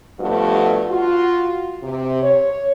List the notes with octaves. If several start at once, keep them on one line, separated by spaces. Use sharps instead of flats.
G2 B2 F3 A3 F#4
F4 F#4
C3
C#5